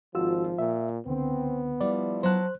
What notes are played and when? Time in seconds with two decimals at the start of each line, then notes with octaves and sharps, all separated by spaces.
0.15 G#1 F3 F4 F#4 E6
0.58 A#2 E5
1.06 C#2 D3 B3 C4
1.81 F3 G3 E4 D5
2.23 F#3 C5 A5 F#6